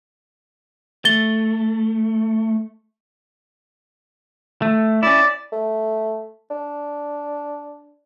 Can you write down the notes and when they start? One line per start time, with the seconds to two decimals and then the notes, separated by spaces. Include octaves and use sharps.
1.05 A3 A6 G7
4.62 A3
5.03 C#4 E4 D5
5.52 A3
6.50 D4